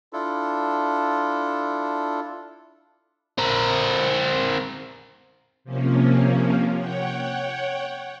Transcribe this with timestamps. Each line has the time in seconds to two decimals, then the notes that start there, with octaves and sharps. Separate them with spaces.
0.13 D4 E4 F4 A4
3.38 C4 A#4
5.64 C3 F3 A#3 C#4
6.75 C#5 F#5 G5